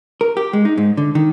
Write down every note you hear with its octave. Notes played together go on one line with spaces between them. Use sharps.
A#4
G4
G#3
D#4
G#2
D3
D#3